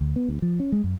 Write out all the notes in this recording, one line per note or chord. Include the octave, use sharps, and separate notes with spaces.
D2
B3
D2
F3
C#4
G#3
F#2